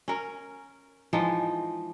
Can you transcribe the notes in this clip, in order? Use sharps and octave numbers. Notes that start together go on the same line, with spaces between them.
C#4 A#4
E3 F3 G#3 D#4